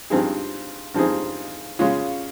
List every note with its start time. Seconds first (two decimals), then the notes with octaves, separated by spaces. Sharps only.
0.10 G2 F3 C4 D#4 G#4
0.94 G2 F3 C4 D#4 G#4
1.79 C#3 G#3 C#4 F4